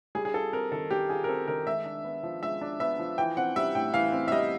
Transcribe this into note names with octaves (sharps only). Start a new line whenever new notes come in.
G3 G#4
G#4
F4 A4
C4 A#4
D#3 A4
G3 G4
F4 G#4
A#4
C4 A4
D#3 A#4
G#3 E5
D4
B3
F3
G#3 E5
D4
B3 E5
F3
E3 G5
C4 F#5
G3 E5
A2 G5
E3 F5
C4
E5
G3 D#5